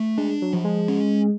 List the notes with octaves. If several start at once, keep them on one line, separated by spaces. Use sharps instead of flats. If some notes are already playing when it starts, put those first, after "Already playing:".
Already playing: A3
G#3 D4
F#3
F3
G#3
C#4